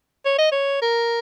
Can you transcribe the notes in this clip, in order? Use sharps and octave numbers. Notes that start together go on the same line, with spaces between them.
C#5
D#5
C#5
A#4